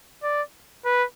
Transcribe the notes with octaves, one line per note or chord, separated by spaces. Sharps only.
D5
B4